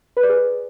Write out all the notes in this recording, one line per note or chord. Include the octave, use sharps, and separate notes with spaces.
B4
D5
G#4